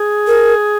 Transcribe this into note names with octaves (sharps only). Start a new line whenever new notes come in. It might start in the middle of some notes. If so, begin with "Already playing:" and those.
Already playing: G#4
A#4